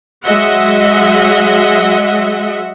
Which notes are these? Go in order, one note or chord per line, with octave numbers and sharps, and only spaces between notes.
F#3 G#3 D#5 E5 F#5